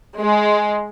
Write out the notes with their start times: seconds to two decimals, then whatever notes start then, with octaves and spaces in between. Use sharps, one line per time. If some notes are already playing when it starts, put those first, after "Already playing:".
0.18 G#3